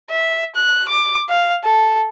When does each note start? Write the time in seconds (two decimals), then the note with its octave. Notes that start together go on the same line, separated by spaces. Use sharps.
0.10 E5
0.55 F#6
0.88 D6
1.29 F5
1.64 A4